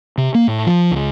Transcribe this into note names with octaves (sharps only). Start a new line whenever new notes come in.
C3
A#3
A2
F3
C#2